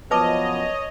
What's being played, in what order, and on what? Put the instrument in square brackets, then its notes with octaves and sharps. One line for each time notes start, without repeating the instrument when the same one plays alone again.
[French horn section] F#2 F3 B3 [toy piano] B4 A5 D6 [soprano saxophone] C#5 [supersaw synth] D#5